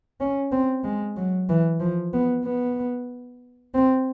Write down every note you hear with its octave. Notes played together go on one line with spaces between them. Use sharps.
C#4
C4
G#3
F#3
E3
F3
B3
B3
C4